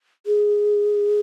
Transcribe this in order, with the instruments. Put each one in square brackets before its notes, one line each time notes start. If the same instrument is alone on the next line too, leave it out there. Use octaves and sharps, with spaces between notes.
[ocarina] G#4